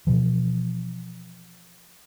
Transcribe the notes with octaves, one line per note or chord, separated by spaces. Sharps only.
B2 E3 F3